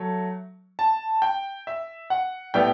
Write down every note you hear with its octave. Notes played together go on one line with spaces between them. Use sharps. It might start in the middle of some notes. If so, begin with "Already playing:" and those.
Already playing: F#3 A3
A5
G5
E5
F#5
A2 G3 B3 G5